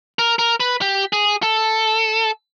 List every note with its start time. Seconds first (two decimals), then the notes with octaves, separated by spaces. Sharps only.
0.19 A#4
0.39 A#4
0.60 B4
0.81 G4
1.13 G#4
1.43 A4